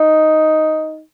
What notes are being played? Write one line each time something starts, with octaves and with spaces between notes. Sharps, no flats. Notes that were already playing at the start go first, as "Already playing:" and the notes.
Already playing: D#4